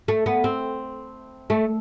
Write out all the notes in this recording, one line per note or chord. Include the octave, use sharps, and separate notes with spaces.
A3
B3
C4
A3